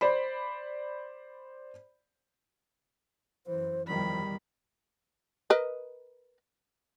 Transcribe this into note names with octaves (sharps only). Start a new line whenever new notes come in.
C5 D5 B5
F#2 E3 C5
E2 D#3 F3 G3 B5
A#4 B4 D#5